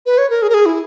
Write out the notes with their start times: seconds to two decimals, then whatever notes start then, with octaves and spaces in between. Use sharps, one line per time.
0.06 B4
0.18 C#5
0.30 A#4
0.42 G#4
0.50 A#4
0.54 G#4
0.66 E4